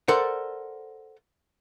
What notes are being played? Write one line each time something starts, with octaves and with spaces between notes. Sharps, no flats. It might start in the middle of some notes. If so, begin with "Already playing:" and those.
A4 A#4 C5 D5 F#5